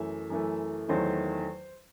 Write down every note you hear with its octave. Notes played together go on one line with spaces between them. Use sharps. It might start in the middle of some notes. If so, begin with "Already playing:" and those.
Already playing: F#2 E3 A3 E5
F#2 E3 A3
E2 D#3 F#3 A3 C5